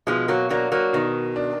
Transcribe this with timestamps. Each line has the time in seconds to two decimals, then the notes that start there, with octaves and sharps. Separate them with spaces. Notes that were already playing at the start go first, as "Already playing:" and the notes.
0.07 B2 F3 G#3
0.28 F#3 A#3
0.50 F#3 A#3 D4
0.72 F#3 A#3
0.93 B2 D#3
1.36 D4